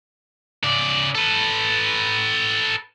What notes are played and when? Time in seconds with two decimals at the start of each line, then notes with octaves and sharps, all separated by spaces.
0.64 C#3 D5
1.15 A4 B4